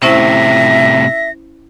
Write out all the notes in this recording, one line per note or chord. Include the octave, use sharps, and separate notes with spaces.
A2 C3 C#4 E4 C5 E5 A#6